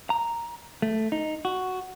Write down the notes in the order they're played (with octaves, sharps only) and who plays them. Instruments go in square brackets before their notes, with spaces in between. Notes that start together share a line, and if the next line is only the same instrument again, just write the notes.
[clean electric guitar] A#5
A3
D#4
F#4